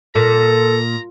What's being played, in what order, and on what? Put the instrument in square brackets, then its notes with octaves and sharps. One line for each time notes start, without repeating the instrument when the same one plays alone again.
[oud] A#2 [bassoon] A4 [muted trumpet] A#5